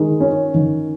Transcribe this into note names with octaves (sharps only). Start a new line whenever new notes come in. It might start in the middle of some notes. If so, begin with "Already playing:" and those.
Already playing: D#3 G#3
C#4
D#3